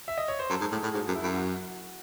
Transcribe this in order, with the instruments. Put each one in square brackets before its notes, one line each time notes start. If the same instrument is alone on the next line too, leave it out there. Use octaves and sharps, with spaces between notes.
[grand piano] E5
D#5
C#5
C5
[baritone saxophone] F#2 [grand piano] A4
[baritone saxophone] G#2
[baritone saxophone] A2 [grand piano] G#4
[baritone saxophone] A2
[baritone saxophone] G#2 [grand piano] F#4
[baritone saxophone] F#2
[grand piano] E4
[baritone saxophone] F#2
[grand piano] F#4